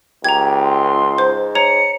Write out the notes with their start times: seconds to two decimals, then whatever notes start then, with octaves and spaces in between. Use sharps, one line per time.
0.24 C#2 G4 A#5 G#6
0.64 C6
1.18 G#2 C5
1.55 C#5 A#5 C#7